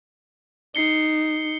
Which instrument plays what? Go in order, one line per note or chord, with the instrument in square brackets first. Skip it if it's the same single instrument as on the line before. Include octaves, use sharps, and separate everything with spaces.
[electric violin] D#4 [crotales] C7 C#7 G7